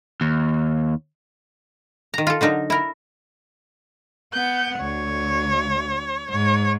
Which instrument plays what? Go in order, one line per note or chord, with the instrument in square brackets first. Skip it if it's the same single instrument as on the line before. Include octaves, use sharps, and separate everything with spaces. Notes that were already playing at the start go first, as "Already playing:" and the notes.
[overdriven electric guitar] D#2
[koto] D#3 A#5
F4 A4
D3 F#3 D#4 A#4
E4 A#4
[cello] B3 F#5 [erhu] G6
[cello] D2 [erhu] C#5
[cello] G#2 [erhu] C#5